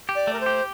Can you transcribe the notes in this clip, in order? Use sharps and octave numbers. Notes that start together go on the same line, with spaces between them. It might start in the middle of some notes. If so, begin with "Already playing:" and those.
G4
D5
A3
A#4
C5
G4